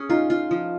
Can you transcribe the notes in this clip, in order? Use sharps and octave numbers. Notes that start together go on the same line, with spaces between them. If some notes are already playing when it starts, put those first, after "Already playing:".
Already playing: C#4 G#4
D#4 F4
F4
F3